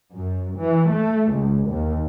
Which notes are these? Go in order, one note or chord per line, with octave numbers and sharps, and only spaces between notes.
F#2
E3
A3
C#2
D#2